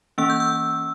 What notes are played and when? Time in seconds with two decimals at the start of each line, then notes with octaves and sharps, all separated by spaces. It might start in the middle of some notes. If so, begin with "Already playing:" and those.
0.18 E3 A#3 C#4 E6
0.30 G6
0.40 E6